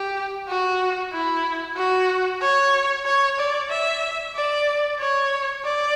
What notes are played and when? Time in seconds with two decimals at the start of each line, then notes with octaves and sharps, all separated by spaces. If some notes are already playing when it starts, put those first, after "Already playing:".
Already playing: G4
0.49 F#4
1.13 E4
1.77 F#4
2.42 C#5
3.06 C#5
3.39 D5
3.70 E5
4.36 D5
5.00 C#5
5.65 D5